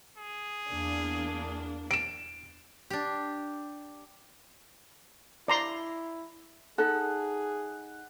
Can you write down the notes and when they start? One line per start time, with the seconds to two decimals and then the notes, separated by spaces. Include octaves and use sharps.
0.18 G#4
0.69 E2 A#3 D4
1.91 D7 E7
2.90 D4 G4
5.48 E4 D5 A#5 C6
6.78 D#4 G#4 A4 F#5